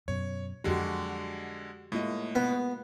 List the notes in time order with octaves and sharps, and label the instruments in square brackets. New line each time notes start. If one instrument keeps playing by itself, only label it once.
[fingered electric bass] F#2 B2 [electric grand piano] C#5
[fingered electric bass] F2 F#3 [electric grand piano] D3 G#3 [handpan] F#4 G4
[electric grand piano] A2 D#5 [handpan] G#3 A#3 F4
[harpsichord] B3